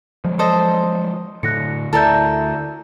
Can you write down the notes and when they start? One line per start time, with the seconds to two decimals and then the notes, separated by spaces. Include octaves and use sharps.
0.25 F3 F#3 G#3
0.39 A4 C5 D#5
1.43 A2 D3 F#6 A#6 C#7
1.93 D2 E4 A4 A#4 D5 E5 G6